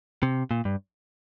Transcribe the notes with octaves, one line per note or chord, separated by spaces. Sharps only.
C3
A#2
G2